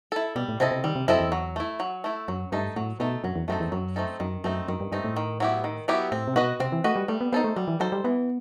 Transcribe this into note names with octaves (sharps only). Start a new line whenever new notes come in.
E4 A4
B2 G3
A2
C3 C4 E4 A4 D#5
C3
D#3 G3
C3
F#2 C4 E4 A4 D#5
E2
F#3
A3 E4
F#3
A3 E4
F#2 F#3
G2 A3 D#4 A4
A2 F#3
B2 A3 D#4 A4
F#2 F#3
E2
F#2 A3 C4 D#4 A4
E2
F#2 F#3
A3 C4 D#4 A4
F#2 D#3
F#2 A3 C4 D#4
F#2 D#3
G2
G2 A3 C4 D#4
A2
D#3
F#3 B3 E4 G4
D#3
F#3 B3 E4 G4
A2 C4
C3
B2 F#4 B4 D#5
C3 C4
E3
A3 F#4 B4 D#5
G3
G3 A3
B3
B3 D#4 A4 C5
A3
F#3 G3
E3
F#3 D#4 A4 C5
G3
E3 B3